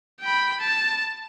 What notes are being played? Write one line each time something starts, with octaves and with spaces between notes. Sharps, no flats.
G5 B5
A5